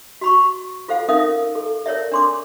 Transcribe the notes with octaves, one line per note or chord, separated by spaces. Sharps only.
F#4 B5 C#6
F4 A4 C5 F5 F#5
C#4 D#4 A#4 E5 F5 D#6
A4
A#4 C#5 D5 E5
D4 C6 D6